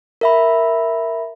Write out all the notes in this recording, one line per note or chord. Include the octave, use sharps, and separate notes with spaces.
A#4 E5 B5